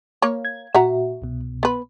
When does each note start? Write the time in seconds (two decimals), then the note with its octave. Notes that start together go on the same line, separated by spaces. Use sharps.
0.22 A#3 C#5
0.45 G#6
0.74 A#2 F#4 E5 F#5 A#5
1.22 C2 B2
1.63 B3 B4